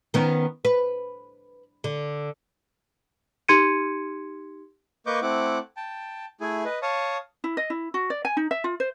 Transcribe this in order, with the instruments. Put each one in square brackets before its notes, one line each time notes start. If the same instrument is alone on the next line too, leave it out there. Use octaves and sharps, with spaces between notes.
[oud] D#3 B3 C#4
B4
D3
[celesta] D#4 G4 C6 G#6 C#7 D#7
[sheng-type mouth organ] A#3 B4 D#5 C#6 D6 G6
A3 C4 E4 F#5 D6
G5 A5
A3 E4 G#4 G#5
B4 D#5
C#5 F5 A5 C#6 D#6
[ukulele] E4
D#5
E4
F#4
D5
G#5
D#4
E5
F4
C5